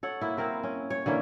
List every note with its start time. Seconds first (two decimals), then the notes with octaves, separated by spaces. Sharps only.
0.03 A4 C#5 F#5
0.21 A#3 E4
0.37 C4 E4 A#4 C5
0.63 C#4
0.90 C#5
1.06 D3 E3 A#3 C#4